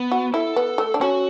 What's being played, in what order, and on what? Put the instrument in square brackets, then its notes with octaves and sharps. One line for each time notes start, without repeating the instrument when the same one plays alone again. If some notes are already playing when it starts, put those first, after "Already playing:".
Already playing: [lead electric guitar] B3
[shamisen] F#4
[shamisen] E4 [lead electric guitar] A4
[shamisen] B3
A3
D4
[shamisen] C#4 [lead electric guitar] F#4